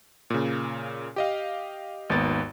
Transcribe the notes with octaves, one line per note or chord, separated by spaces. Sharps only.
A#2 C#3
G4 D#5 F5
G#1 D#2 B3 A6